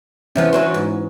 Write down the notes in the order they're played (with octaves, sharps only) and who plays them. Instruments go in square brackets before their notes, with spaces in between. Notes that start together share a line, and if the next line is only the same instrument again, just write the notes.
[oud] C3 F3 B3 [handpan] E3 C#4
[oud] D3 F#3 C5
G#2